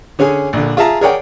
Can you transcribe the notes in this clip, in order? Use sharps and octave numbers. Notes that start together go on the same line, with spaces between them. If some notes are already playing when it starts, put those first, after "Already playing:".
D3 C#4 G#4 G#5
A#1 D3
F4 G#4 E5 A5 A#5
G#4 A#4 C#5 D5 F#5 G5